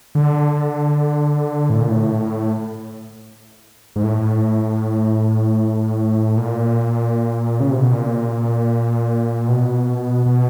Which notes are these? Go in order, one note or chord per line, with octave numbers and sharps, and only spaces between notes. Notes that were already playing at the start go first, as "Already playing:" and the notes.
D3
A2
A#2
A2
G#2
A2
A#2
C#3
C3
B2
A#2
B2
B2